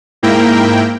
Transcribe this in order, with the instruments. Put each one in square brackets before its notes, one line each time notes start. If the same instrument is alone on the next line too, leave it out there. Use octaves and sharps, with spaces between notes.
[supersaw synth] G#2 A#3 E4 A#4 G5